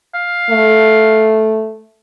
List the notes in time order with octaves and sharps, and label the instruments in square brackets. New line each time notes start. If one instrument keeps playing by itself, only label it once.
[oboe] F5
[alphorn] A3